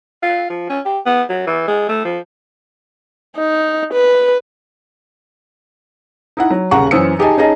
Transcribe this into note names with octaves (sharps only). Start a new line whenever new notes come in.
F4
F3
C#4
G4
B3
F#3
E3
G#3
A3
F3
D#4
B4
D#4 E4 F#5
F#3
D#1 C#3 F#5 A#5 C#6
F#2 E3 C5 D#6 E6 C#7
D#4 G4 G#4 D#5 G#5 A5
C#4 D#4 G#4 D#5 A5